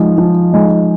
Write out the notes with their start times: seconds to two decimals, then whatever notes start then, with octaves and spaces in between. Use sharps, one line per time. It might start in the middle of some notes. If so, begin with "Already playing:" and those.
Already playing: F3 G#3 D#4
0.18 F3
0.53 G#3 D#4